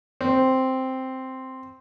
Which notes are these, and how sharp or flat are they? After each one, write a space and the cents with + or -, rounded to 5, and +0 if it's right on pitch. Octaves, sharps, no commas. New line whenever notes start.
C4 +0